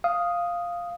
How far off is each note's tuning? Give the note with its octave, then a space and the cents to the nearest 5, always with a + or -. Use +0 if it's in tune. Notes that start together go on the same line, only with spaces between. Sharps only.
F5 +0 D#6 +0